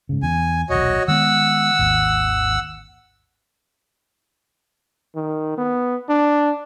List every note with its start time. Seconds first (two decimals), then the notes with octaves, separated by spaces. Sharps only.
0.09 G#2 C#3
0.23 E2 G#5
0.70 D#1 B1 F#4 C#5 D#5
1.08 D#3 G#3 B3 F#5 E6
1.79 G#1 D#2
5.16 D#3
5.58 B3
6.09 D4